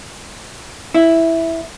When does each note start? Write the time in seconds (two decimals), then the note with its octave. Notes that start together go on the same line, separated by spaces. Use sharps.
0.95 E4